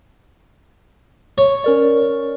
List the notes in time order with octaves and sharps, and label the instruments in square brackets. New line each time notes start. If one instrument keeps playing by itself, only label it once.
[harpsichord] C#5
[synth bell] C#4 A#4 D5